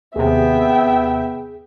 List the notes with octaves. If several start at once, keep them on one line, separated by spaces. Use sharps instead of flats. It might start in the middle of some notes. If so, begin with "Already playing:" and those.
D#2 C3 B3 G#4 E5 G5